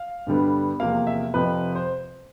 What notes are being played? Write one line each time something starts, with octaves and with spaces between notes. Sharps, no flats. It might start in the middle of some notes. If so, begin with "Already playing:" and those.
Already playing: F5
G2 D3 G3 B3
E2 C3 F3 A#3 F5
E5
F2 C3 F3 B4
C5